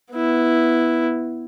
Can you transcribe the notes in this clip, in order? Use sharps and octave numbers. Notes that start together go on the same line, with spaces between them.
B3 E4